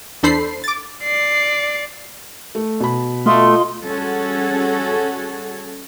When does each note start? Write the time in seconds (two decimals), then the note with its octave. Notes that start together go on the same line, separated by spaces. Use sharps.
0.23 E2 D4 A4 C5 B5 C7
0.64 D6 A6
1.03 D5 C7
2.55 A3
2.80 B2 B5
3.26 A3 F4 D#5 C6
3.82 G3 C#4 F#4 G#4 A4